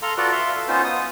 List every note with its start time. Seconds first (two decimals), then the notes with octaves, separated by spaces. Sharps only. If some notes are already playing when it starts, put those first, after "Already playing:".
0.02 A4 F5 A#5 C6
0.17 F4 F#4 A4 B4 D5
0.32 E5 F5 C6
0.55 A4
0.68 B3 C#4 D#4 F4 C5
0.84 B3 D#6